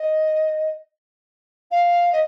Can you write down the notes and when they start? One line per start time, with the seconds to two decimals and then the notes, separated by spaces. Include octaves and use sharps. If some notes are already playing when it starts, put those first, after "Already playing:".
Already playing: D#5
1.71 F5
2.12 D#5